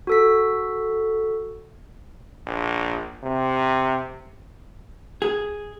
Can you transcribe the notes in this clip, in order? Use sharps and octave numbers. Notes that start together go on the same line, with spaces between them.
F#4 A4 B6
A#1
C3
G#4